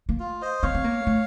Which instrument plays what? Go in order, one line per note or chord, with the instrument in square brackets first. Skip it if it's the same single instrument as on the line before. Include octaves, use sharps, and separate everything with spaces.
[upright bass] A#3
[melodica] F4
C5 D#5
[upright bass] C4 [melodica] C#5 F5
[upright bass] C4
A#3
A3